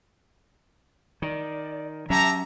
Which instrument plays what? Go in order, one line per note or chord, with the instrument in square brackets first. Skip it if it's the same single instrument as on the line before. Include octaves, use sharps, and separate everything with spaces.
[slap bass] D#3 [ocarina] D5
[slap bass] F#3 C#4 [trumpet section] G4 E5 A#5 [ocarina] A5